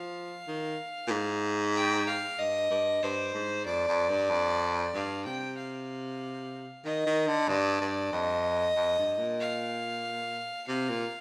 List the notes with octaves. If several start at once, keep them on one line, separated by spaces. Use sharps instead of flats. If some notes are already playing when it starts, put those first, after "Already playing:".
Already playing: F3 F5
D#3
A#2
G#2
G5
F5
G2 D#5
G2
G2 C5
G#2
F2 D5
F2
G2
F2
G2 F5
C3 G5
F5
D#3 D#5
D#3
D3
G2 D5
G2
F2 D#5
F2
G2
A#2
F5
C3 F5
A#2